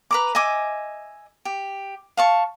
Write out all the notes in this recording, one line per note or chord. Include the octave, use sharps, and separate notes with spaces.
B4 A#5 D6
D#5 E5 G#5 D6
G4
F5 A5 C#6